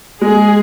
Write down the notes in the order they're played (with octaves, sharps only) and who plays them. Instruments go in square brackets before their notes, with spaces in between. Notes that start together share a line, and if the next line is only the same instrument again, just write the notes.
[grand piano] G#3 [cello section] G#4